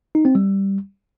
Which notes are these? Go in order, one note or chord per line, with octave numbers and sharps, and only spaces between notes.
D#4
C4
G3